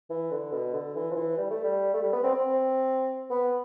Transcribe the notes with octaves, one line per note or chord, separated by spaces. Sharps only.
E3
D3
B2
D3
E3
F3
E3
G3
A3
G3
A3
G3
B3
C4
C4
B3